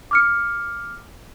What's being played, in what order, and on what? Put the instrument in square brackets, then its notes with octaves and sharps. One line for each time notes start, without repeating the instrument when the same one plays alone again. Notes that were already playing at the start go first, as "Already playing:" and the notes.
[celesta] D6 F6 C#7